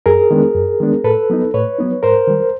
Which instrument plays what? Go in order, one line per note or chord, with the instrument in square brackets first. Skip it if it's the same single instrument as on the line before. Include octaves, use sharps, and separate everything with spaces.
[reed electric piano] F#2 G#4 A#4
D#3 G#3 B3 D4
F#2
D#3 G#3 B3 D4
A2 A4 B4
F#3 B3 D#4
A2 B4 C#5
F#3 B3 D#4
G#2 A#4 C5
D#3 G3